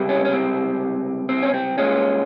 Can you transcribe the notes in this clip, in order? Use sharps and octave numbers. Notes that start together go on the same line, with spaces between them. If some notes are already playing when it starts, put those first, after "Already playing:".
Already playing: C#2 C3 G3
C#4
C#4
C4
C4
C#4
C4
C2 A#2 G#3 C#4